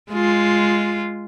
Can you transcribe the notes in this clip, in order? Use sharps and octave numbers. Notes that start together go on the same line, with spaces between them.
G#3 F4